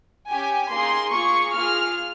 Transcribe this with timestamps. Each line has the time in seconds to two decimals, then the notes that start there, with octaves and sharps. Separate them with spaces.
0.28 C#4 G4 G#5
0.70 A#3 D#4 G#4 C6
1.12 A#3 F4 G#4 C#6
1.55 A#3 F4 G#4 F6